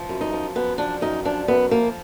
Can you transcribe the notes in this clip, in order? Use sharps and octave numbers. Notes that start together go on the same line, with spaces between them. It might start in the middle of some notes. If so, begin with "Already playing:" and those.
Already playing: F3
F#2
D#4
F3
F#2 B3
F3 D4
F#2 D#4
F3 D4
F#2 B3
F3 A#3